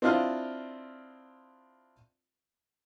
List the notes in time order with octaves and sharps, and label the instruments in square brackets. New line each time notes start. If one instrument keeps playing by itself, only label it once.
[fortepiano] C4 D4 E4 F4 D#5 F5